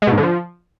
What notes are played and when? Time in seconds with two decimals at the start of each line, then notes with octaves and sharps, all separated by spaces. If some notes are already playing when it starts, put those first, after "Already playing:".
0.02 G#3
0.07 B2
0.12 G#2
0.18 D3
0.23 F3